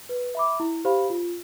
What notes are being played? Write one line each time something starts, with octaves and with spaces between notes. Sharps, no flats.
B4
E5 B5 D6
E4
G4 C5 F5 B5
F4